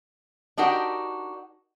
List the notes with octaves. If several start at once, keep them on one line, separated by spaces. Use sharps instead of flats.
D4 D#4 F#4 G4 A#4